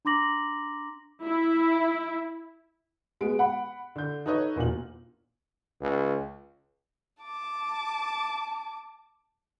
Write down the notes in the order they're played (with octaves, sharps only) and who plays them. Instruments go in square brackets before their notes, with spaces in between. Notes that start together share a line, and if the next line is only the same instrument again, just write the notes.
[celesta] D4 A#5 C6 D6 A#6 F#7
[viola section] E4
[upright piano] G#3 B3 D7
F#5 B5
D3 G6
D#4 A4 B4 C#5 D#5
E1 A#2 F4 F#7
[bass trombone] C#2
[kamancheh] A5 D6